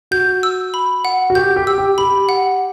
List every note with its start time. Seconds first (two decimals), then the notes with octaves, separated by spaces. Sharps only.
0.11 F#4 G6
0.43 E6
0.74 B5
1.05 F#5
1.30 F#4
1.35 G4 G6
1.56 G4
1.67 E6
1.78 G4
1.98 G4 B5
2.29 F#5